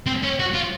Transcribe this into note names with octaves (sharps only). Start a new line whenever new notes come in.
C4
C#4
F#4
F4